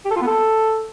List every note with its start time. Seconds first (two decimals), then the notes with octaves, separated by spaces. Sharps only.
0.05 G4
0.11 A4
0.16 F4
0.22 B3
0.27 A4